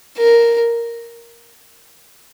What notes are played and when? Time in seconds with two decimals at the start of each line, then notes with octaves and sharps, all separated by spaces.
0.18 A#4